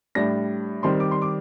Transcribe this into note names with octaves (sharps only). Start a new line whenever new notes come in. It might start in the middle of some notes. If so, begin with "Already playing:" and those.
A2 G3 D4 A#6
D#3 G3 C4 C6
D6
C6
D6